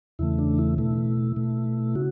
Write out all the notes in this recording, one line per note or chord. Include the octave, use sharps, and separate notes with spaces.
E2 C#3 E3 A3 E4
D4
E4
B2 A3 E4
B2 A3
C#3 F#4